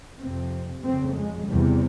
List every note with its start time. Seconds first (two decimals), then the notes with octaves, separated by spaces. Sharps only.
0.20 F2 C3 C4
0.84 F2 C#3 C4
1.17 G#3
1.48 E2 C3 G3